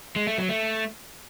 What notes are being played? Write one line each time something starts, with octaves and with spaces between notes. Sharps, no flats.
G#3
A3
F#3
A3